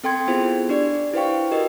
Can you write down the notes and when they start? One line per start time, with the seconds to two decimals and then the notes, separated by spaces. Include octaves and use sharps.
0.04 C4 A4 G5 C6 G#6
0.27 B3 E4 F4 G#4 C5
0.69 D4 G4 D5
1.14 E4 B4 C5 F5 G5 C#6
1.51 F#4 G4 A#4 B4 D#5